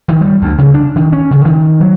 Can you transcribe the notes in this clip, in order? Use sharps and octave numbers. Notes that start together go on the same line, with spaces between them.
D#3
G3
D2
C#3
D4
D#3
C#4
C#3
D#3
F#3